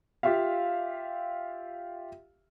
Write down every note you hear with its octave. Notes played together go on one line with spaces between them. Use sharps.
F4 G4 E5 F5